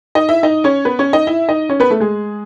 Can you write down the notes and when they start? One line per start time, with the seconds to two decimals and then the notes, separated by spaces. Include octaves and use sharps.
0.15 D#4 D#5
0.29 E4 E5
0.43 D#4 D#5
0.64 C#4 C#5
0.85 B3 B4
0.99 C#4 C#5
1.13 D#4 D#5
1.27 E4 E5
1.49 D#4 D#5
1.69 C#4 C#5
1.80 B3 B4
1.90 A3 A4
2.00 G#3 G#4